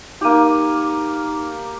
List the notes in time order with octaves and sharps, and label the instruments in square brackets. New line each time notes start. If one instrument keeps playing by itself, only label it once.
[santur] A#3 G4 [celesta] D#4 D#7